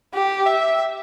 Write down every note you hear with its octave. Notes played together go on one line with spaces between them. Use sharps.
G4
E5